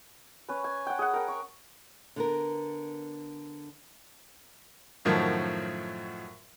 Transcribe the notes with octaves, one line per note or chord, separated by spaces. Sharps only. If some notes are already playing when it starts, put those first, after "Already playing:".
C#4 B4
G#5
F#5 G5
G#4 F#5
A#4 G5
C#6
D3 B3 A#4
F#2 A2 D#3 F3 F#3